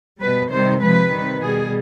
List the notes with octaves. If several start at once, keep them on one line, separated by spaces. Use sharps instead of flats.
B2 G3 B4
C3 D#3 G3 C5
C3 F3 G#3 B4
C3 D#3 G3
B2 G3 G#4